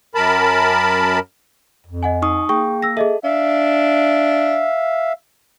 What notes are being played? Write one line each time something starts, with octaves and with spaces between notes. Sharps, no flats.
F#2 A#4 A5 B5
F2
D#5 F#5 G#5
D#4 C#6 D#6
A#3 G#4 G5 C#6
E6 A#6
G#4 A4 D#5 E5
D4 E5 F5